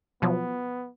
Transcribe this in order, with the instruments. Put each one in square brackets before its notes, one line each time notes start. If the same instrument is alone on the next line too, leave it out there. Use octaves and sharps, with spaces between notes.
[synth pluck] B2 F3 F#3 [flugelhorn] B3